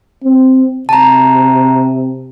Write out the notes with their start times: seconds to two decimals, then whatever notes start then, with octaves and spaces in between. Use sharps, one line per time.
0.25 C4
0.89 C3 A5 A#5